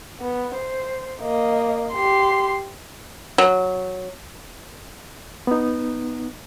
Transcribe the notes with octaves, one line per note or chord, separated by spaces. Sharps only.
B3
C5
A#3 D#5
G4 C6
F#3
B3 D#4